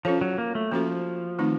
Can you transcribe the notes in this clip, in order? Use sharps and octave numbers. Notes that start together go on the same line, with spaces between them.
F3 C#4 F4 A4 C#5
F#3
A#3
A3
F3 A#3 C#4 F#4 A4 C5
D#3 A3 C4 D#4